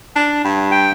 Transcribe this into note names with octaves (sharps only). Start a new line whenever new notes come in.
D4
G2
G5